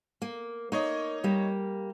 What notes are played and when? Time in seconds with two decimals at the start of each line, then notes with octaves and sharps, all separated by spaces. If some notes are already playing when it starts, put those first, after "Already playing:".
0.22 A#3
0.72 A#3 D#4 C#5 D#5
1.24 G3 A#3